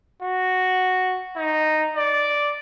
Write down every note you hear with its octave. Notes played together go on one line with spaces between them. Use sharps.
F#4
D#4
D5